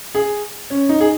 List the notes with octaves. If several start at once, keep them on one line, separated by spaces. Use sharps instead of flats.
G#4
C#4
D#4
G#4